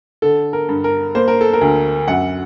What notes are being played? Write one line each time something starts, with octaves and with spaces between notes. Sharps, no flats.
D3 A4
A#4
G2
A#4
A#3 C5
A#4
A4
A#4
D2
F#2 F#5